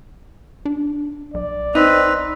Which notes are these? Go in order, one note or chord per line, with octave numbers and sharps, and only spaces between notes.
D4
B1 D5
C4 D#4 B4